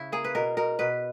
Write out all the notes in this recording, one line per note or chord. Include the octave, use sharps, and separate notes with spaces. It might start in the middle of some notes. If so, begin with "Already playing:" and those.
Already playing: C#3 E4
A#3 G#4
B4
B2 A#4
B2 A#4
B2 B4